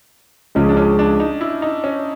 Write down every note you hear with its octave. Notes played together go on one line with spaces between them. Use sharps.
C#2 C#3 F3 G#3 C#4
D4
C#4
D4
D#4
E4
D#4
C#4